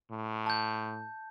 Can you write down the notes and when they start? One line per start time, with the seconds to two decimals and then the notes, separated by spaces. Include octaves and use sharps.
0.11 A2
0.46 A5 G6